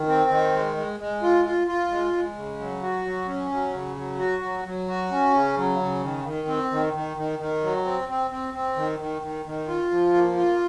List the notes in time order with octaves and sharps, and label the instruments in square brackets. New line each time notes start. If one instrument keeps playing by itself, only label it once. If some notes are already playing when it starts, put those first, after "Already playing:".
Already playing: [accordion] D#3
C4
D#3
G#3
G#3
G#3
F4
F4
F4
G#3
G#3
C#3
F#3
F#4
F#3
C#4
F#3
C#3
F#3
F#4
F#3
F#3
F#4
C#4
C#3
F#3
C#3
D#3
D#3
C4
D#3
D#3
D#3
D#3
F#3
C4
C4
C4
C4
D#3
D#3
D#3
D#3
F4
F3
A#3
F4